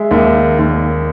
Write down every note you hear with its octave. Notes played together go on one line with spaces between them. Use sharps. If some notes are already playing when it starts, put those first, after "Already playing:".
Already playing: G#3 E5
D#2 E5
D#2